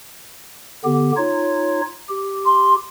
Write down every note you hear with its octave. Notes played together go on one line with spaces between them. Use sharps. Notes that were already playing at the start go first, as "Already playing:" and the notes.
D3 B3 G4
D#4 F4 C#5
G4
C6